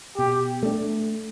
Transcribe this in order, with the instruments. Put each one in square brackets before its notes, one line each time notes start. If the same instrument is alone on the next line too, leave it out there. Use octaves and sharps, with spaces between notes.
[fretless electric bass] B2 [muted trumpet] G4
[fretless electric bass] A3 D4